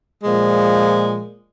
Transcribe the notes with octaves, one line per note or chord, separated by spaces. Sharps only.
A#2 F3 G#3